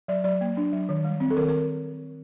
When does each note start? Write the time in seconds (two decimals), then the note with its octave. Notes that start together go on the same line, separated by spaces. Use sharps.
0.08 F#3 D5
0.24 F#3 D5
0.41 A#3
0.57 D4
0.73 F#3
0.89 D#3
1.04 G3
1.20 C4
1.31 A4
1.37 D#3 A#4
1.48 A#4